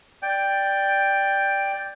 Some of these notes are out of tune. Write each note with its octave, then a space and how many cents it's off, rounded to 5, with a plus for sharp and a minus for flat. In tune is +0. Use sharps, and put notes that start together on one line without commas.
D5 +0 G5 +5